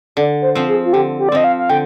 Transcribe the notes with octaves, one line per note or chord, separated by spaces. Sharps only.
D3 D5
C5
F3 C4
G#4
F4
D3 G4
G4
D5
F3 C4 D#5
F5
F5
D3 G5